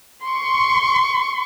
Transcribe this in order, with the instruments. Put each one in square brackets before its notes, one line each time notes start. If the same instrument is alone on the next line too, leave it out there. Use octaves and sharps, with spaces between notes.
[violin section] C6 C#6